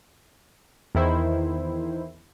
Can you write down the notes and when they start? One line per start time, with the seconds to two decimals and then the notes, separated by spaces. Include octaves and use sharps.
0.95 E2 D#3 E4 C5